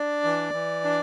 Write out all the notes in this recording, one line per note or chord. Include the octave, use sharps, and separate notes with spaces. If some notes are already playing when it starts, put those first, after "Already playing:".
Already playing: D4 D5
E3
E3
D4